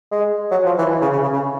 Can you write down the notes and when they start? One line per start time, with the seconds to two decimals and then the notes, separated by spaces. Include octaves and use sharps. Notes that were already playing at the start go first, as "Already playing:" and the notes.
0.11 G#3
0.51 F#3
0.65 F3
0.78 E3
1.02 C#3
1.12 C#3
1.23 C#3
1.33 C#3